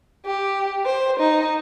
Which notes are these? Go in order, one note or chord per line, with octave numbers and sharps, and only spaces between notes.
G4
C5
D#4